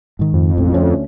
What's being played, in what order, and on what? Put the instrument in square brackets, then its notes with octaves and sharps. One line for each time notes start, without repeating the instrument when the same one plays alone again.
[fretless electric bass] G#2 D#3
[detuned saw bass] F2
[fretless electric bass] E1 A1
D2 A3 C#4